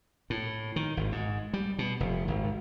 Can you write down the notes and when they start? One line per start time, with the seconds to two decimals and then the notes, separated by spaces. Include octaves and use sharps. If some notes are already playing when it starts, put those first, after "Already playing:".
0.30 A2
0.76 D#3
0.97 G#1
1.12 G#2
1.53 G3
1.79 B2
2.00 F1
2.28 G#1